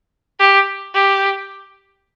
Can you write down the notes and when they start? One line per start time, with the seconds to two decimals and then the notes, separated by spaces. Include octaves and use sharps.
0.40 G4
0.94 G4